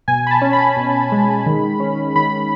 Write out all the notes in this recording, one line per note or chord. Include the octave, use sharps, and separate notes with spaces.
B2 G#5
B5
A5
C#4
B5
B2
G#3
D#3
C#4
D#3 B5